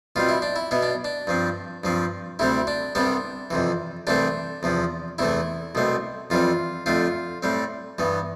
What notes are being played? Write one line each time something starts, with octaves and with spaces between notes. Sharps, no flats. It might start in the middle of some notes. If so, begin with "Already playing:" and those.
B2 G3 C4 F4
E4
D4
E4
B2 B3 E4
D4
D4
G2 F3 C4
G2 F3 C4
D2 C3 G3 C4 E4
D4
C2 C3 G3 B3 D4
F2 C3 E3
C2 C3 E3 A3 C4 D4
E2 C3 F3
E2 C3 E3 A3 E4
C2 B2 A3 C4
F2 E3 G3 C4 F4
F2 D3 A3 C4 F4
A2 G3 C4
G2 E3 B3